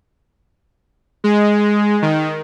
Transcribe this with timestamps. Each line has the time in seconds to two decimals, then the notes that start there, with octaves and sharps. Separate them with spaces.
1.24 G#3
2.02 D#3